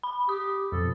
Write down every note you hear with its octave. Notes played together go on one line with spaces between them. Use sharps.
B5
G4 D#6
F2 B2 A4